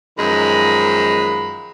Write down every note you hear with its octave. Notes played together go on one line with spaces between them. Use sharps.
F#2 D#3 F3 G#3 A#5 B5